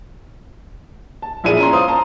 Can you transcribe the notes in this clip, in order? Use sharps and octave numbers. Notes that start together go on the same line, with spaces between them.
A5
A#1 A#3 E4 G#4 D5 D#7
C#4 A#5 C6
C5 F5 C6 D#6
A5 A#5